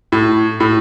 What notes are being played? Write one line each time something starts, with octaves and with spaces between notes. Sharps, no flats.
A2
A2